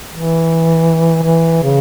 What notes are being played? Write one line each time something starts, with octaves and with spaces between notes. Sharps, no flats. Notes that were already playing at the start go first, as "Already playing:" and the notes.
E3
E3
C#3